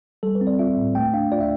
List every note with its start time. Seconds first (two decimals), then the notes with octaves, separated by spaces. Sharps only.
0.23 G3 A4
0.35 B4
0.41 C4
0.47 D5
0.59 F4 E5
0.78 A2
0.95 A3 G5
1.13 D4 F5
1.32 F4 D5
1.41 E5